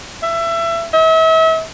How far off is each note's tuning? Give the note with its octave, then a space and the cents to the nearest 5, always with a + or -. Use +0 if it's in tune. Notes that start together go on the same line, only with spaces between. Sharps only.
E5 +25
E5 -40